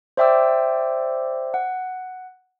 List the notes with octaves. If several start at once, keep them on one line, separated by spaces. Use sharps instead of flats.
C5 D5 E5 G5 D6 E6
F#5